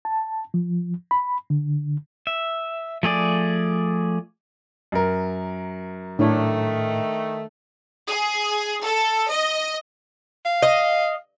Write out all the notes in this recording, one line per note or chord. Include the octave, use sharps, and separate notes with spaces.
A5
F3
B5
D3
E5
F3 A3 G#4 D5
F#2 A#4
A2 D#3 A3 D4 E4 C#5
G#4
A4
D#5
F5
D#5